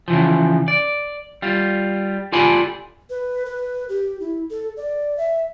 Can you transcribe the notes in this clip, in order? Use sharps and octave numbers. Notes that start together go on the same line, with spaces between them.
C#3 E3 F3
D5
G3 F4
F4 G4 A4 D5 G#5 B5
B4
B4
G4
E4
A4
D5
E5